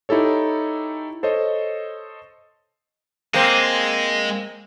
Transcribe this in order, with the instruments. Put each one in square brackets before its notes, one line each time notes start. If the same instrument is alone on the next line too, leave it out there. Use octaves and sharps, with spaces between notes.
[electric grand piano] D#4 E4 G4 A4 C#5
A4 C5 C#5 D#5
[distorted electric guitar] G#3 [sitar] A#3 C4